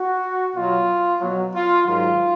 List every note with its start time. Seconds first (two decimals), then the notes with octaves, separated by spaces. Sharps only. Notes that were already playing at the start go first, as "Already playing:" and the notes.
Already playing: F#4
0.55 B2 F#3 F4
1.21 B2 F#3
1.54 F4
1.86 G#2 D#3 F#3 F4